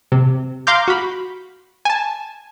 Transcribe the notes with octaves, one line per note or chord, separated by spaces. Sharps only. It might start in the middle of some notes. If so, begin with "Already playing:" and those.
C3
F5 A#5 C6 D6 F6 G6
F#4 B5
G#5 A5